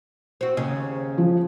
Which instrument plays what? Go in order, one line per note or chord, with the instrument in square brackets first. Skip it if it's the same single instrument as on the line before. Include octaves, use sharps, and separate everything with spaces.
[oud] C4 F#4
D#2 C#3
[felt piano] F3